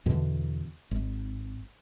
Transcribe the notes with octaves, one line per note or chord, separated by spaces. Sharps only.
E2 B2 D3 E3
G#1